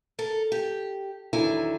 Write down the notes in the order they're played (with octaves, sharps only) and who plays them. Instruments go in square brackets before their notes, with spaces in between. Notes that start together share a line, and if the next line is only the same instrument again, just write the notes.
[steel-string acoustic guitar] A4 A#4
G4
E2 D3 D#3 F#3 E4 G#5